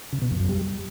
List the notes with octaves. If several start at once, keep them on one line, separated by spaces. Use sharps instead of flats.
C#3
B2
F2
F#2
G3